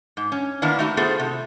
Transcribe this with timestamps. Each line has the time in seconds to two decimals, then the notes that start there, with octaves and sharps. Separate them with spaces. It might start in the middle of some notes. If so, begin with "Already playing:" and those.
0.17 G#2
0.32 C#4
0.62 D#3 A#3 B3 D4 E4
0.79 A3 D#4 E4 F#4
0.97 A3 B3 F4 G#4 C5
1.20 C3